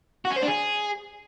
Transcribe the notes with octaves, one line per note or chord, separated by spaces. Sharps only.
F#4
C#4
C5
D4
G#4